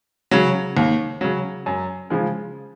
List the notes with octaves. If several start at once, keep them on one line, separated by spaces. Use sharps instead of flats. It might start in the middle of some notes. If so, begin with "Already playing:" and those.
C#3 F#3
D#2
C#3 F#3
F#2
C#3 F3 G#3